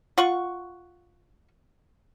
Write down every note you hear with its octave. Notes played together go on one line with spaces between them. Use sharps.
F4 F#5 C#6